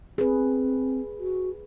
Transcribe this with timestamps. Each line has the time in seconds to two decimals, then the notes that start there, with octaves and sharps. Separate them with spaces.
0.18 C4 G#4 B4
1.19 F#4